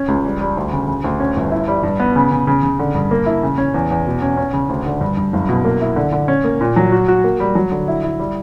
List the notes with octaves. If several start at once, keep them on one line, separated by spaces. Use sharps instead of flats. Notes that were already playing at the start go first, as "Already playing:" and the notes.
Already playing: C#4
C#2
G3
G3
D2
C#3
C#3
D2
C#4
G1
E4
G3
G2
B3
C#3
C#3
C#3
C#3
D3
G2
A#3
E4
C#3
C#4
E2
E2
B2
C#4
C#4
C#3
D2
D3
G2
G2
F#1
B2
A#3
E4
D3
D3
C#4
A#3
A#2
F#3
F#4
F#4
A#3
G3
F#3
D3
E4
E4
G3